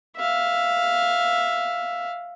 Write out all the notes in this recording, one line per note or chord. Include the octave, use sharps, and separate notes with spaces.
E5 F5